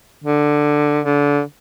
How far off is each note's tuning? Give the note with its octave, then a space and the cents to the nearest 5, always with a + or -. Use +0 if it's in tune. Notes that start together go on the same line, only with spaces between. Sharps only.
D3 +10
D3 -25